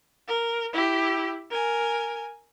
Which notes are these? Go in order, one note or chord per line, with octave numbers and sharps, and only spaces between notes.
A#4
E4 G4
A#4 G#5